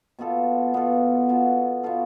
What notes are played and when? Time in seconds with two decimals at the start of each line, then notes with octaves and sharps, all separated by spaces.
0.19 B2 B3 F4 A4
0.74 B2 B3 F4 A4
1.29 B2 B3 F4 A4
1.83 B2 B3 F4 A4